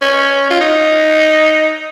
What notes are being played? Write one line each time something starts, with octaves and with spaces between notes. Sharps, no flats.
C#4
F4
D#4